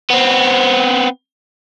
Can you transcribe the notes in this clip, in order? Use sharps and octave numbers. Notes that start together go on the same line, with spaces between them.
B3 C4